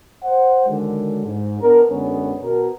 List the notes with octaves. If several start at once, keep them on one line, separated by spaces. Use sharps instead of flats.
C5 F#5
D3 D#3 F#3 G#3
G#2
B3 D4 A#4
F#2 D3 G#3 B3 C#4
B2 A#4